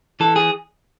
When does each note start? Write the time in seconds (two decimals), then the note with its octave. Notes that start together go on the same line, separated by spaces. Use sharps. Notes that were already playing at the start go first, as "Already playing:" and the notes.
0.20 E3 A4
0.36 G#4